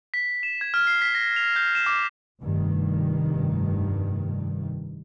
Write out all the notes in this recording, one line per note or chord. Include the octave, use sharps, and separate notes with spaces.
B6
E7
G#6
F6
C7
B6
A#6
F7
G6
E7
D6
F1 G2 D#3